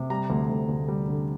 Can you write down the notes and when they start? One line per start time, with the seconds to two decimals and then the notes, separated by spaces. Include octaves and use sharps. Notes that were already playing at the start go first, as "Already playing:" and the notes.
Already playing: C3
0.10 G3 A#5
0.30 D2
0.50 D2
0.69 D2
0.88 G3
1.08 D3